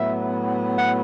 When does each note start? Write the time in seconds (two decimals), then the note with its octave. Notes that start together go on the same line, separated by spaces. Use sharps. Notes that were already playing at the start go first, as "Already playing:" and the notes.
Already playing: A2 F#3 B3 E5
0.78 F#5